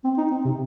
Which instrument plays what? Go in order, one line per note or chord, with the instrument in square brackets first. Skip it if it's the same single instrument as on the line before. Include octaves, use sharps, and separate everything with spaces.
[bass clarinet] C4
D#4
C4
C3